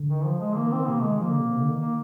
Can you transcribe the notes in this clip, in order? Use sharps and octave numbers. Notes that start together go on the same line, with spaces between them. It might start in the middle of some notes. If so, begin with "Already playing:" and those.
Already playing: D3
D#3
F3
G#3
D#3 A#3
D#3
C4
D#3
C3 A#3
D#3 G#3
F3 A#3
D3
C3
C3
D3
D#3
A#3